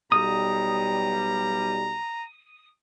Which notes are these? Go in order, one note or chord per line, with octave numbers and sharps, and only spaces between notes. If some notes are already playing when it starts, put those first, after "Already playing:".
B1 G3 A#5 D#6